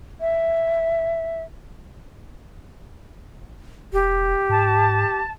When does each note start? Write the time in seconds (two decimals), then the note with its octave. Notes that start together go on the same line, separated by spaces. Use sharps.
0.20 E5
3.93 E1 G4
4.49 G#2 A5